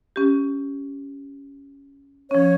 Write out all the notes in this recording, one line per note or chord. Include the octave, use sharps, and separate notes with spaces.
C#4 G4
F3 C#4 C#5